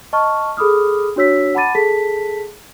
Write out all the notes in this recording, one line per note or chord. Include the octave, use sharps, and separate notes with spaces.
D#5 A5 C#6 F6
G#4 A4 B5 D6 D#6 F6
D4 F#4 C#5 E6 B6
F#5 A5 B5 D6 A6 D#7
G#4 A4 A5 B6